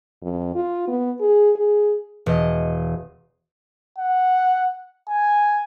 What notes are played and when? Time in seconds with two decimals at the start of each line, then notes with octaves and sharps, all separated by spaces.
0.23 F2
0.55 F4
0.88 B3
1.21 G#4
1.56 G#4
2.26 E1 D#5
3.98 F#5
5.08 G#5